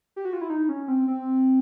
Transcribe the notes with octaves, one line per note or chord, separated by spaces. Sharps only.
G4
F#4
F4
E4
D#4
C#4
C4
C4